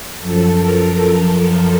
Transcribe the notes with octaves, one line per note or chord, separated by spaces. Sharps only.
F#2 F3 A4
A#4
A4